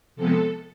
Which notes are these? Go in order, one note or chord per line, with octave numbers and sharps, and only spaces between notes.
C3 F3 G#3 B3 A4